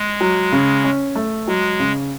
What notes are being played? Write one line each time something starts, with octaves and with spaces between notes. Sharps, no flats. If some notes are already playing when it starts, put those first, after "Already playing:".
Already playing: G#3
F#3
C#3
C#4
A3
F#3 G#3
C#3